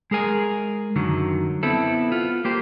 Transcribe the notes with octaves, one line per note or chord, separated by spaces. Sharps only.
G#3 G#4 A#4 G#5
F#2 D3 D#3 F#3
B3 C4 E4 A4
B3 F4
A#3 G4 C5